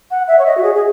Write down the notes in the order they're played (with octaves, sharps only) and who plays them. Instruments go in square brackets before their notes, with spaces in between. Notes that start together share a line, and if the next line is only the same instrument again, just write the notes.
[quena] F#5
E5
C#5
D#5
F#4
G#4
G#4